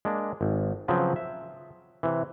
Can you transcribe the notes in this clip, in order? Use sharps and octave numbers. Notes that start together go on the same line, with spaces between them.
G#3 A#3 D4
G#1
C#3 F3 F#3 C4 B4 C#5
E5
C3 E3